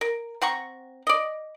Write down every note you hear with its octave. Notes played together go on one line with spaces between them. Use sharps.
A#4
C4 F#5 A#5 C#6
D5 D#5